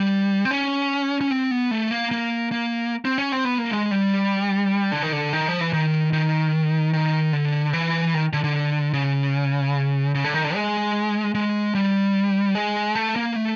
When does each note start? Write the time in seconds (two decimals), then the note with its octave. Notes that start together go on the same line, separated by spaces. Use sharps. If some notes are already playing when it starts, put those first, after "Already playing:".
Already playing: G3
0.45 C4
0.51 C#4
1.21 C#4
1.31 C4
1.51 B3
1.71 A3
1.91 A#3
2.11 A#3
2.52 A#3
3.05 C4
3.18 C#4
3.32 C4
3.45 B3
3.58 A#3
3.71 G#3
3.91 G3
4.92 D3
5.03 D#3
5.12 D3
5.33 D#3
5.48 F3
5.61 E3
5.73 D#3
6.13 D#3
6.93 D#3
7.33 D3
7.73 E3
8.14 D#3
8.33 D3
8.44 D3
8.93 C#3
10.15 C#3
10.24 D3
10.34 D#3
10.44 D3
10.55 G#3
11.35 G#3
11.75 G3
12.55 G#3
12.95 A3
13.16 A#3
13.36 A3